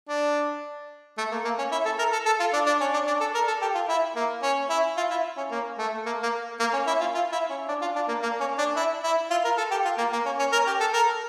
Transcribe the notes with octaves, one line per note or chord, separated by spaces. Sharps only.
D4
A3
A#3
A#3
C#4
E4
A4
A#4
A4
A4
F4
D4
D4
C#4
D4
D4
A4
A#4
A4
G4
F4
E4
A#3
C#4
E4
F4
E4
C#4
A#3
A3
A#3
A#3
A#3
C#4
E4
F4
F4
E4
C#4
D4
F4
D4
A#3
A#3
C#4
D4
E4
E4
F4
A#4
A4
G4
F4
A#3
A#3
C#4
C#4
A#4
G4
A4
A#4